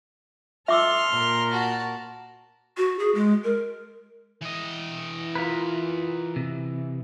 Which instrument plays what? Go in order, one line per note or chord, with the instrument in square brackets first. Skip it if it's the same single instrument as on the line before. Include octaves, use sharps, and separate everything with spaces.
[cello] A4 [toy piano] E5 D6 E6 [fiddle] C6 F6
[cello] A#2 A#4
[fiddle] F#4 A5
[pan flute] F#4
G#4
G#3
A#4
[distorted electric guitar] E3 D#5
[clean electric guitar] F4 A#4 B4
C3